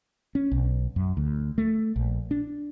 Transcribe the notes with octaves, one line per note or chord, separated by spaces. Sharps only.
C#4
B1
F#2
D2
A3
A#1
D4